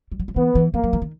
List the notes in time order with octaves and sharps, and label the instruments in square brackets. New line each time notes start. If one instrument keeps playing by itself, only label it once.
[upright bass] G3
F#3
F3
[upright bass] E3 [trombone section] B3
[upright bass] E3
[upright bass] F3 [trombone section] A#3
[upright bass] F#3
E3
D#3